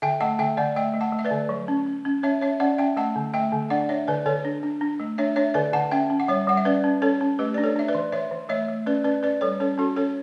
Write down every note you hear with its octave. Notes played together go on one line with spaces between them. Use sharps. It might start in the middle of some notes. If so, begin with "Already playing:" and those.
D3 E5 G5
A3 F#5 A5
D3 E5 G5
D3 D5 F#5
A3 E5 G5
A3
F#5 A5
A3
E5
B4 D5
D3
F#3
C#4
C#4
C#4
C#4 C#5 E5
C#4 C#5 E5
C#4 D5 F#5
C#4 E5 G5
A3 F#5 A5
D3
A3 E5 G5
D3
D4 D5 F#5
D4 C#5 E5
D3 B4 D5
D3 A4 C#5
D4
D4
D4
A3
D4 C#5 E5
D4 C#5 E5
D3 B4 D5
D3 F#5 A5
C#4 E5 G5
C#4
F#5
G3 C#5 E5
G3 F#5
E5
C#4 B4 D5
C#4
C#4 A4 C#5
C#4
A3 G4 B4
D4 D5
A4 C#5
D4 E5
B4 D5
E3
E3 C#5 E5
E3
A3 C#5 E5
A3
C#4 B4 D5
C#4 B4 D5
C#4 B4 D5
G3 A4 C#5
C#4 A4 C#5
C#4 F#4 A4
C#4 A4 C#5